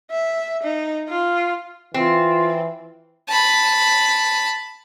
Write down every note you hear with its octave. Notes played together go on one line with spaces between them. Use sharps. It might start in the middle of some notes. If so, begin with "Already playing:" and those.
E5
D#4
F4
E3 C4 F4
A5 B5